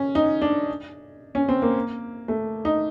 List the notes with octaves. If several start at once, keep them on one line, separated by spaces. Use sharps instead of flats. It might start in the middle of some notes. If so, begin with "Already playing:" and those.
Already playing: C#4
D#4
D4
C#4
C4
A#3
A3
D#4